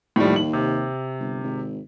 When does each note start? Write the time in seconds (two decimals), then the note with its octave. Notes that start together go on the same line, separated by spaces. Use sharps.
0.16 D#2 A2 F3 G3
0.36 F#7
0.53 C3
1.20 G1
1.43 G#1